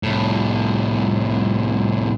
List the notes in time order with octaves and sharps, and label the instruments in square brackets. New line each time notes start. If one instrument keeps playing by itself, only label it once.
[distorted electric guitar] C2 A2